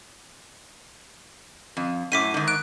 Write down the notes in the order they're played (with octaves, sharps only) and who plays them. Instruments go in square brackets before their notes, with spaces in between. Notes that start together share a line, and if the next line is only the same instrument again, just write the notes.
[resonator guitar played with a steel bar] F2
[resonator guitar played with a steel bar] F#2 A2 [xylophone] D6 B6 D#7
[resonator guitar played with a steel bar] G#2 D#3
[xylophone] F#6 D7